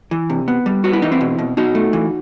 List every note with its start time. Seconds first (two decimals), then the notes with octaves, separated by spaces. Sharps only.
0.11 E3
0.30 C3
0.48 B3
0.66 G3
0.84 B3 F#4
0.93 E4
1.02 E3 D#4
1.12 C4 E4
1.21 B2
1.38 B2
1.57 B2 D#4 F#4
1.75 A3
1.93 E3